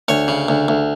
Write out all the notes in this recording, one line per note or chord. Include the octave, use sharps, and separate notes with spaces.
D2 C#5
C#3
D2
D2